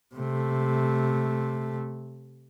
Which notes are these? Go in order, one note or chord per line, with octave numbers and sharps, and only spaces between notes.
C3 A3